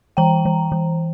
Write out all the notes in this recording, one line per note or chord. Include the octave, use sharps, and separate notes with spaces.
E3 G5 A#5
E3
E3